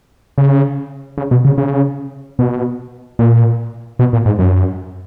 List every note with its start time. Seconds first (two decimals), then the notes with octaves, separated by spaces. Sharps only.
0.38 C#3
1.18 C#3
1.31 B2
1.45 C#3
1.58 C#3
2.39 B2
3.19 A#2
3.99 B2
4.13 A#2
4.26 G#2
4.39 F#2